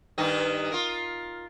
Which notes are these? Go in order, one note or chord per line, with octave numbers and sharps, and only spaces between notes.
G2 D#3 D#4
F4 A#4